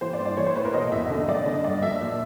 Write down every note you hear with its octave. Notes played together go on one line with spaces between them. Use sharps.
E3 C5
D5
G2
D5
E3 C#5
C5
A2 B4
A#4
B2 D#5
E2 E5
D3 D#5
F#2 D5
D3 D#5
G2 D5
F3 E5
A#2